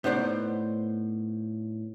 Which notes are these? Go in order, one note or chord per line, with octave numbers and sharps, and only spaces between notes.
A2 B3 D#4 C5 D5